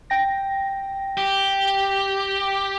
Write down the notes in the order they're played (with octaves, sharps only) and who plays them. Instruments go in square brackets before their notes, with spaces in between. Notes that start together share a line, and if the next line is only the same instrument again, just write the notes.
[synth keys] G5 A#6
[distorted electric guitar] G4